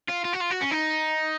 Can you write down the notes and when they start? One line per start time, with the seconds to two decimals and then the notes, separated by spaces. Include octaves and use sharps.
0.09 F4
0.25 F4
0.34 F#4
0.41 F4
0.51 F#4
0.62 C#4
0.72 D#4